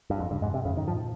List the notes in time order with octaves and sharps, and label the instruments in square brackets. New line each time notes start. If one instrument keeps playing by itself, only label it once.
[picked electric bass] G2
F2
[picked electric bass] G2 [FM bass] C#3
[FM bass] F2 [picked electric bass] G#2
[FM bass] G2 [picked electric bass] C3
[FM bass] F2 [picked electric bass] C#3
[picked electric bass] D#3
[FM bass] G2
[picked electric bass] F3
[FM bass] G#2
A#2